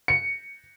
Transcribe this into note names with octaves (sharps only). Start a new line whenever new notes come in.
C#7